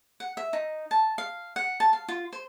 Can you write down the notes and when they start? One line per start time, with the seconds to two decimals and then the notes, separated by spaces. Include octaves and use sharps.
0.20 F#5
0.37 E5
0.53 D#4
0.91 A5
1.18 F5
1.56 F#5
1.80 A5
1.93 F5
2.08 F4
2.33 C5